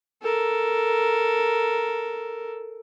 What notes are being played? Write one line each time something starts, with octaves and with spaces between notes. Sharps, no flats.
A4 A#4